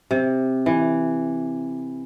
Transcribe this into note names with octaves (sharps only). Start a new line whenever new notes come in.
C3
E3